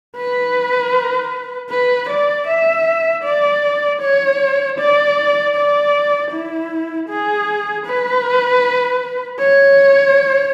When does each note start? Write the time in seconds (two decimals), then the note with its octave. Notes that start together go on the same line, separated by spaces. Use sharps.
0.17 B4
1.70 B4
2.09 D5
2.48 E5
3.23 D5
4.01 C#5
4.78 D5
5.55 D5
6.31 E4
7.09 G#4
7.86 B4
9.40 C#5